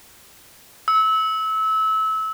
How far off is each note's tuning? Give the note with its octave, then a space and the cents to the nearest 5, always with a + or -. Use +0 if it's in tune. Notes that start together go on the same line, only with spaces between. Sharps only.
E6 -25